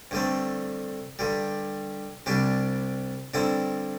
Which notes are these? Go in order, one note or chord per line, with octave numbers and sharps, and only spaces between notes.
G2 D3 A3 C4
G2 D3 G3
C2 C3 G3 D4
G2 D3 C4 E4